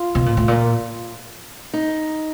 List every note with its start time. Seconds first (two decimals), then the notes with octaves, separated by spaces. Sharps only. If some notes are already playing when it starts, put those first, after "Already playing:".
Already playing: F4
0.15 B2
0.26 A#2
0.37 A2
0.48 A#2
1.74 D#4